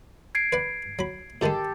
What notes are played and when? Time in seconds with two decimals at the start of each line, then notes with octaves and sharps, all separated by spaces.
0.35 G#6 C7 D7
0.52 B4 D5 F#5
0.99 F#3 B5
1.41 G#2 D#3 G#3 G4 A4